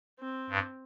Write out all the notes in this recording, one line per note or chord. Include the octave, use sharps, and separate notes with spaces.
C4
G2